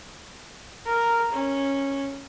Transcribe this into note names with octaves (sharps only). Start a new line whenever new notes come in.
A#4
C#4